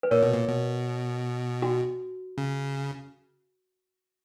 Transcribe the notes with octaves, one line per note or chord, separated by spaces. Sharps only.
B4
A#2 A#4 C#5
B2
A#2
B2
F#4
C#3